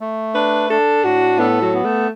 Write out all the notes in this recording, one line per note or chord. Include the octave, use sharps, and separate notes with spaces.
A3
D4 B4
D4 A4
A2 F#4
B3 A4
F#3
B3
A3